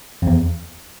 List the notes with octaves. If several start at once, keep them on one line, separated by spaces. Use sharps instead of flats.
F2
E2